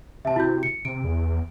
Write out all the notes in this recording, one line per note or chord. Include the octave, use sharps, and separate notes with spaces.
C3 E5 A5
E4 F#4 G6
C#7
C3 D7
E2